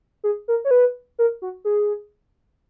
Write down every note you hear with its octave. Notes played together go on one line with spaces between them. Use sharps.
G#4
A#4
C#5
B4
A#4
F#4
G#4